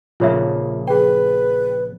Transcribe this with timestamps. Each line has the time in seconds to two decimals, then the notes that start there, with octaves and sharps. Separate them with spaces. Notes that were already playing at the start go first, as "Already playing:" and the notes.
0.20 A#1 C#3 A#3 F4 C#5 E5
0.88 G#4 B4 G5